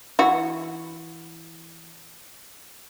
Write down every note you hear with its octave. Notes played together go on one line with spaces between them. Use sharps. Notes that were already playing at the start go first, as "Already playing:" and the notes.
E3 F#4